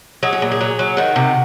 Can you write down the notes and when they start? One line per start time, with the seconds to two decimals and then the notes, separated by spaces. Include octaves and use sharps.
0.23 F#3 G#4
0.33 G#4
0.42 A#2
0.52 G#4
0.61 F#3
0.79 F#3
0.97 D#3 F#4
1.16 C3